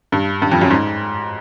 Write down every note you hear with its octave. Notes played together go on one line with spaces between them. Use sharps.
G2
G2
F2
F#2
G#2